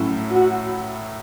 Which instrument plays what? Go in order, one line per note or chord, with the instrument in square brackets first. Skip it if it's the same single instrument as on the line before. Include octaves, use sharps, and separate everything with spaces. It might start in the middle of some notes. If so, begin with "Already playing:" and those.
Already playing: [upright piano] A2 F#3 C#4 E4
[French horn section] F#4